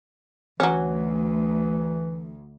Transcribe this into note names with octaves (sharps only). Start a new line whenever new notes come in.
D2 E3 F#3 C#4